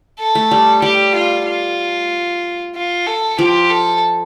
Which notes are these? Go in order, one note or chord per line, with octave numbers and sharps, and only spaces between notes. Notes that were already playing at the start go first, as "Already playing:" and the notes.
A4
A3
G3
G3 G4
F4
F4
F4
A4
F3 G4
A4